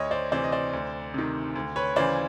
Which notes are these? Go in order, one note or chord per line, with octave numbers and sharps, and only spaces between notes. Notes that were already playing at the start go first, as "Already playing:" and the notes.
Already playing: D2 C#5 D#5
C5 D5
C3 E3 C5 D5
D#5
C5 D5
D2
C3 D#3
D2
B4 C#5
C#3 E3 C5 D5